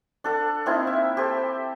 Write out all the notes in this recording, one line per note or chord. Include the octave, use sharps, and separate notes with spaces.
D4 A4 F#5
A#3 C4 D#4 E4
E5
G4 A4 C5